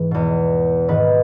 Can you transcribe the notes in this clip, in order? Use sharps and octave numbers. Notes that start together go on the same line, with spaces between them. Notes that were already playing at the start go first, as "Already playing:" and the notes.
Already playing: G#2 E3
E2 B2
G#2 D#3 B4